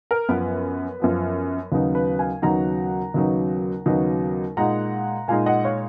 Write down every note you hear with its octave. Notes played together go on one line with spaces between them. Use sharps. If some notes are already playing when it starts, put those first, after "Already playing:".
A#4
F#2 F3 B3 B4
F#2 F3 B3
D#2 C#3 F#3 B3 D#4 B4
B4
F5 G#5
D#2 C#3 F#3 B3 D#4 F#5 A#5
D#2 C#3 F#3 B3 D#4
D#2 C#3 F#3 B3 D#4
A#2 G#3 D#4 F#5 A#5
A#2 G#3 D#4 F5 G#5
D#5 F#5
C#5 F5